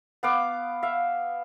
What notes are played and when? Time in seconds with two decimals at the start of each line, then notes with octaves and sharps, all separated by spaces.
0.23 B3 F5 D6
0.83 E5 F5